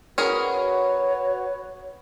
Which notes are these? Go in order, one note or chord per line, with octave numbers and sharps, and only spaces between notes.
C#4 F#4 G#4 A#4 B4
C#5